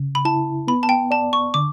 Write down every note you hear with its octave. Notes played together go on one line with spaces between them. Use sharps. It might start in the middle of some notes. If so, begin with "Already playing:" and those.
Already playing: C#3
B5
E4 A5
B3 B5
A5
G5
D5 A5
C#6
D3 D6